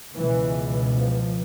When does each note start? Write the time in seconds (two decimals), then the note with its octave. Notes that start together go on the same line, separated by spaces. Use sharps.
0.15 C#2 B2 E3
0.94 F3